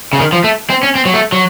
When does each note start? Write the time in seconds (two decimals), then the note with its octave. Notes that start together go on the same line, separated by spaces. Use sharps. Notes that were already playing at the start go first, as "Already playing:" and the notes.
0.13 C#3
0.19 D#3
0.32 F3
0.44 A3
0.70 C4
0.83 C#4
0.95 C4
1.05 F#3
1.14 A3
1.32 F#3